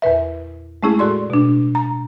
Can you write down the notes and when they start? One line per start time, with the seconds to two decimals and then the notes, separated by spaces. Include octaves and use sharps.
0.02 E2 A#2 B4 E5
0.83 G#3 A3 C#4 E4 G#4
0.99 A2 F#4 D5 C6
1.30 B2 D4
1.75 A#5